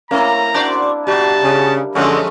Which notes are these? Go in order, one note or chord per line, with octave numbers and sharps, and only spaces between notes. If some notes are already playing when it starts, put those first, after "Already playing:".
A3 A#3 C4 C#4 E4 A#5
D4 F#4 C5 D5
B2 G3 F#4 A5
C#3
F#2 D3 F3 G#3 A3 B3 C#4 D#5